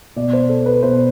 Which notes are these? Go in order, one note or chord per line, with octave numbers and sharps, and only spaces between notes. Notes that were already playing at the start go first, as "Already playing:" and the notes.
B2 D5
C5
A4
B4
B2 C5